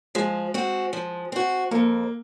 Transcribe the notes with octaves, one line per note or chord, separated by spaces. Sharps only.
F3 G#3
C4 F#4
F3
C4 F#4
F2 A#3